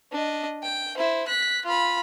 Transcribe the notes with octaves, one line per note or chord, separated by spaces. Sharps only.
D4 D#5
G5
E4 C5
F#6 B6
F4 B5